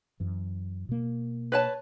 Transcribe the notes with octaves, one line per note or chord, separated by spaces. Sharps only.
F#2 E3
B2 A#3
B4 C#5 A5